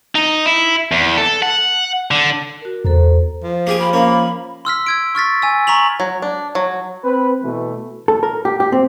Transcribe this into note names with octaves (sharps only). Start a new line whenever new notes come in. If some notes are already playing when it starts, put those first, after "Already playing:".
D#4
E4
E2
A4
F#5
D3
F#4 A#4
E2 A4 C5 A#5
F3
A#3 G4 G#4 G#5
B5
A#3 C#4
C6 E6 F6 B6
E6 G#6 D7
C#6 F6 A6 B6
G#5 E6
A#5 C#6 B6 F7 F#7
F#3
D4
F#3
C4 B4
B2 E3 A3
A4
A#4
G4
G4
C4